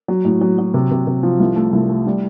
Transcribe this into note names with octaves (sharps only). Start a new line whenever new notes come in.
F#3
A2
F#3
F#3
C3
C3
C3
F3
C2
A3
C2
A3
G3